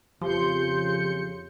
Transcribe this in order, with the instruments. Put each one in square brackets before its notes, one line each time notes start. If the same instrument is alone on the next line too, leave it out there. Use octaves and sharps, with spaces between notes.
[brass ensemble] F2 C#3 [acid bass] F3 [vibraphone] G4 [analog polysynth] C6 G6 C#7